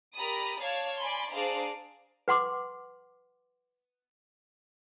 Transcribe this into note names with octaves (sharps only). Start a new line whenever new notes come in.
G4 A#4 D5 A#5 B5 D#6
C#5 D5 F5 A5 F6 G#6
D5 G#5 B5 C6
D4 G#4 C5 D5 F5 A#5
B4 F#5 C6 D6